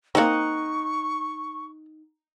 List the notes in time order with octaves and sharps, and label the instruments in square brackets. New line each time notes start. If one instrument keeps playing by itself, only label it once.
[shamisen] A#3 C4 [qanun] D#4 F#5 [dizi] C#6